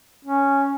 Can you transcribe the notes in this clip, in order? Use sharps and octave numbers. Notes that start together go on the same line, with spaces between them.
C#4